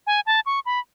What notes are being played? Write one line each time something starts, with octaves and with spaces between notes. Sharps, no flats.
G#5
A5
C#6
B5